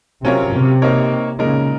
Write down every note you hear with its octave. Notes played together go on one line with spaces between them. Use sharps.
C3 F#3 C#4 F4 A#4 C#5
C3
A#3 D#4 A#4 C#5
A#2 C#3 G#3 D#4 A#4